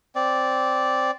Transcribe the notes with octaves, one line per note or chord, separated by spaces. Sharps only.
C4 D5